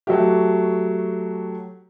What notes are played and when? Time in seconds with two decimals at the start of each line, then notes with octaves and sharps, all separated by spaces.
0.07 F#3 A3 F#4 G4